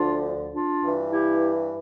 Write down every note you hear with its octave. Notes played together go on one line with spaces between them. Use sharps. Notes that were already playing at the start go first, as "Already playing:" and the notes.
Already playing: D2 D3 F3 D4 F4
D4 F4
G2 E3
E4 G4